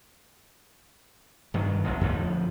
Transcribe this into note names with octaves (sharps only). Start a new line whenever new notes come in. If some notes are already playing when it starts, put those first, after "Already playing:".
G2 D#3 F#3
A1 B2
F2 A2 D3 F3